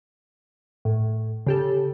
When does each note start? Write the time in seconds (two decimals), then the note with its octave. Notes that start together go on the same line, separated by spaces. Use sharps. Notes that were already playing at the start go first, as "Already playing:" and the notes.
0.85 A2
1.47 C#3 G4 A4